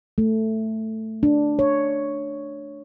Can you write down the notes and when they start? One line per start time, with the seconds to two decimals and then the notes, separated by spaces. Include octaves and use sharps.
0.18 A3
1.23 D4
1.59 C#5